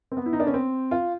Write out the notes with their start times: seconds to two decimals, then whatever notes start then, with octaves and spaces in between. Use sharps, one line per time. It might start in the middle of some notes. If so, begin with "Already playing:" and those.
0.12 C4
0.17 B3
0.26 E4
0.33 D#4
0.40 D4
0.47 C#4
0.54 C4
0.91 F4